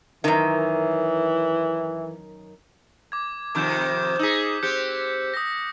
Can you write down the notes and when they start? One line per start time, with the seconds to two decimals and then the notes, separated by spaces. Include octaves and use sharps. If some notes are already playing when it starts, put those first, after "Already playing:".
0.24 F#2 D#3 E3
3.12 D6 G#6
3.55 F2 C3 D#3 D6 G6 E7
4.19 D#4 G#4 E6 B6
4.63 C4 G4 F#6 G6 C#7
5.34 D#6 A#6